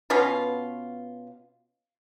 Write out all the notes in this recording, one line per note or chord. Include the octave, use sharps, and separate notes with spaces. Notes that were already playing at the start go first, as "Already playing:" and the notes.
B2 B3 C#4 F4